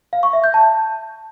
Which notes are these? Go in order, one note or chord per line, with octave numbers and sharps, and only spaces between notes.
F5
C#6
E5
G6
A5